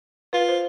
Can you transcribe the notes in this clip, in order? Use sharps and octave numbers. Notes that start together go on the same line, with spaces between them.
F4 B4
C5